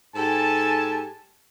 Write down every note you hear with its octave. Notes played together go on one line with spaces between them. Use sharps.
G#2 G4 A4 G#5 A5